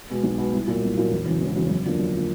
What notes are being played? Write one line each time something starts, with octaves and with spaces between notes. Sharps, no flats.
B2 G#3 B3
B1
B2 G#3 B3
C2
A#2 F#3 A#3
C2
A#2 F#3 A#3
E1
E2 C#3 F#3
E1
E2 C#3 F#3
F#2
D3 F3 A#3
F#2
D3 F3 A#3